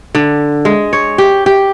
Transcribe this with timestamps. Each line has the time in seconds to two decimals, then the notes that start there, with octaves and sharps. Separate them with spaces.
0.15 D3
0.65 G#3
0.93 C#5
1.18 G4
1.46 G4